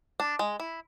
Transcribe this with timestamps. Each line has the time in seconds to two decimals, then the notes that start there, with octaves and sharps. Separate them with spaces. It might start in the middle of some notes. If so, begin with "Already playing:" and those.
0.20 D4
0.39 G#3
0.60 E4